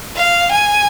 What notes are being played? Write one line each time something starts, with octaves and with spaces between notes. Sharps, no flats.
F5
G#5